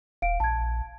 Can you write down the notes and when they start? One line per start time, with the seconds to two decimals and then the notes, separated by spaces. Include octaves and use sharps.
0.22 D#1 F5 D7
0.40 A#1 A5 G#6